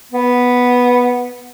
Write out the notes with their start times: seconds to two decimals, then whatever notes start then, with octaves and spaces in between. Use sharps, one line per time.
0.12 B3